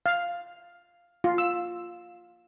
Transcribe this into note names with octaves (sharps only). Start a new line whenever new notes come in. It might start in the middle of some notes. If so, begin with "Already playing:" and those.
F5
F4
E6